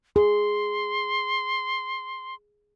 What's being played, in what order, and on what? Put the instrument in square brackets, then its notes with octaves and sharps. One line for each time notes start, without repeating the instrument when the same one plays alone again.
[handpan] G#4 [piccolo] C6